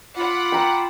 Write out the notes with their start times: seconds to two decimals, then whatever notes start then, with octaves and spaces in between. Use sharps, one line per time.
0.17 F4 F#5 B5 D6
0.52 G5 A#5 E6